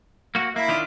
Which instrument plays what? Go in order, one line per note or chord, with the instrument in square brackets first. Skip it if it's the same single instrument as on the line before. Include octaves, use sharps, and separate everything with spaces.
[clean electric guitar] A#3 F#4
[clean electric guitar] A#3 [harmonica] E4
[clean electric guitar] D#3 D4 F4